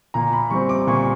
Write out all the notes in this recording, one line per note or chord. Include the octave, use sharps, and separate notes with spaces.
A#2 A#5
B5
G3 C4 C#6
D6
A#2 C#6